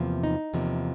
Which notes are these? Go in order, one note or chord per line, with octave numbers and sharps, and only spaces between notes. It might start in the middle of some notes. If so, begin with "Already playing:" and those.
Already playing: E2 C3 F3 A#3
D#4
E2 C3 F3 A#3